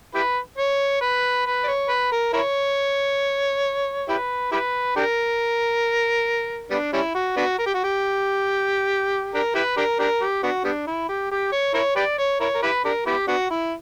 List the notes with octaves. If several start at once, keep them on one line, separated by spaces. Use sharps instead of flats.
E4 G4 B4
C#5
B4
B4
D5
C#5
B4
A#4
E4 A#4 C#5
E4 G4 B4
E4 G4 B4
D4 G4 A#4
G3 B3 D4
G3 C#4 E4
F#4
B3 D4 F#4
A#4
G4
F#4
G4
D4 G4 A#4
E4 G4 B4
D4 G4 A#4
D4 G4 A#4
G4
B3 D4 F#4
G3 B3 D4
E4
G4
G4
C#5
E4 A#4 C#5
G4 B4 D5
C#5
E4 A#4 C#5
A#4
E4 G4 B4
D4 G4 A#4
B3 E4 G4
B3 D4 F#4
E4